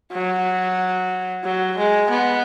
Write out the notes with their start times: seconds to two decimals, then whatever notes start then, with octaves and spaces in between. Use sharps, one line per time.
0.12 F#3
1.44 F#3
1.77 G#3
2.10 B3